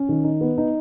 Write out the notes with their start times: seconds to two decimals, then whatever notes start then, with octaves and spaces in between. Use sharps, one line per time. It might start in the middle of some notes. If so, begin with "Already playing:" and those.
Already playing: C#4
0.09 D#3
0.24 D#4
0.41 B3
0.58 D#4